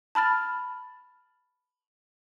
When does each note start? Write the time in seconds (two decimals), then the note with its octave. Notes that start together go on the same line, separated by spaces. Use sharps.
0.15 A5 B5 F6 A6